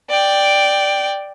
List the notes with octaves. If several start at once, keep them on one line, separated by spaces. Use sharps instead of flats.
D5 G5